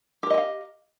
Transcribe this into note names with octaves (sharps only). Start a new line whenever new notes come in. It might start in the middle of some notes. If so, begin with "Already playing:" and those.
G4 A#4 D#5 F5 G5